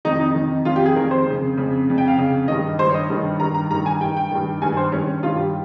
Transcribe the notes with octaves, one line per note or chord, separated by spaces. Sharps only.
F2 D#3 D#4
D#4
F2 D#3
F2 D#3 F4
G4
G#4
F2 D#3 A#4
C5
F2 C#3
F2 C#3
F2 C#3
G5
F5
F2 C#3
G2 D#3 D#5
G2 D#3 C5
C#5
D#5
G2 D#3
G2 D#3 A#5
A#5
G2 D#3 A#5
G#5
G2 D#3 G5
G5
G2 D#3
G2 D#3 G#5
C5
G2 D#3 C#4
C#4
G2 D#3 F4
G4